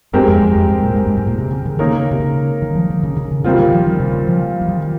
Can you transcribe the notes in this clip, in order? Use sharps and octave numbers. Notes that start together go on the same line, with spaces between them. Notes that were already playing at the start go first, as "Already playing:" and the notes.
G2 G#3 C4 G4 A#4
F2
F2
F2
G2
A#2
G#2
G2
G#2
A#2
C3
C#3
D#3
C#3 A#3 D#4 A#4 C#5
C3
C#3
D#3
F3
D#3
C#3
C#3
C#3
A#2 C#3 G3 C4 F4
D#3
F3
D#3
C3
C#3
F3
F3
D#3